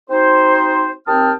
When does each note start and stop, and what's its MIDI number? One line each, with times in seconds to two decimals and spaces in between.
0.09 0.91 60
0.09 0.91 63
0.09 0.91 66
0.09 0.91 72
1.07 1.32 39
1.07 1.32 60
1.07 1.32 79
1.07 1.32 81
1.07 1.32 87
1.07 1.32 89